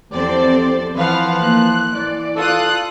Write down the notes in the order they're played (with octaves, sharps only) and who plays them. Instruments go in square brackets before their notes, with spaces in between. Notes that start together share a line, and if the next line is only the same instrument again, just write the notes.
[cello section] E2 F3 C4 [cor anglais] G4 [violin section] A4 C5 D5
[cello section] E3 [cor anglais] F3 [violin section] B4 F5 F#5
[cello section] E3 A#3 [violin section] F#6
[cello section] E3 D5
[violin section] F4 D#6 F#6 [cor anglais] A4